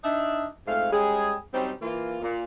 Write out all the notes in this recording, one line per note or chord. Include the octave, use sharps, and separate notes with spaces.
D4 D#4 E5
F2 G#2 A3 F5
G3 G#3 C#4 G#4
F#3 G3 C4 C#4 D#4 C5
E3 A#3 F4
A#2